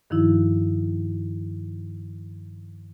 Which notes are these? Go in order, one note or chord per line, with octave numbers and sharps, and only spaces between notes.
G2 D#3 F3 D#4 E4 F#4